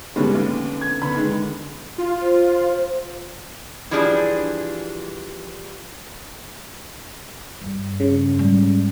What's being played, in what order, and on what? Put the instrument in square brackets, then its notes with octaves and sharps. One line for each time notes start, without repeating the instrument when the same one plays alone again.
[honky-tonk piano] B2 G3 G#3 [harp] D3 B3 C#4
[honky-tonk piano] D#2
G#6
[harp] D3 B3 [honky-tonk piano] B5
[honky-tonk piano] D#3 G#3
[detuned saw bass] F4
[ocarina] C5
[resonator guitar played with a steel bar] E3 F3 G3 D4 G#4
[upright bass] G2
[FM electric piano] C#3
[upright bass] G#2 G3